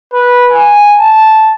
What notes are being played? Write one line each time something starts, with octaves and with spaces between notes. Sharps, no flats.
B4
G#5
A5